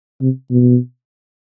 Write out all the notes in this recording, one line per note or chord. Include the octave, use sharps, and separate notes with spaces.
C3
B2